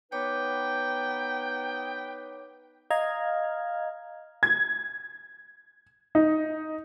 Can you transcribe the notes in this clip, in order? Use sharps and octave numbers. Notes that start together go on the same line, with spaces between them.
B3 D#4 B4 C#5 G5 D6
D#5 F5 A#5 F6 G#6
G#6
D#4